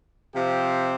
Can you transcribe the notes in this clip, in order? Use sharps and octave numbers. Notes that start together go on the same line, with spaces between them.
C3 F3 C4 G4